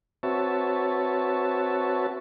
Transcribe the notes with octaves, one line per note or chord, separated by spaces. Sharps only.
C4 F#4 B4 C#5 E5 A5